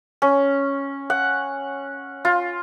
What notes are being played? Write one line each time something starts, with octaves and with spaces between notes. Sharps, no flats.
C#4
F#5
F4